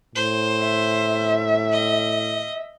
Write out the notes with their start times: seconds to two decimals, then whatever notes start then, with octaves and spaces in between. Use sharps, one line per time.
0.15 A2 C5
0.63 E5
1.72 D#5